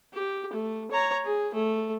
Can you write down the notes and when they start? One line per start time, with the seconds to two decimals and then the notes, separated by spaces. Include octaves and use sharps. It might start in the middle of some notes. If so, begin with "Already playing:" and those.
0.14 G4
0.53 A3
0.91 C#5 A#5
1.25 G#4
1.54 A3